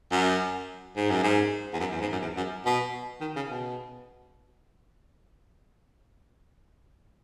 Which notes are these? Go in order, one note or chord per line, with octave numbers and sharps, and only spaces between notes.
F#2
G#2
F#2
G#2
E2
F#2
E2
G#2
F#2
E2
F#2
B2
D#3
C#3
B2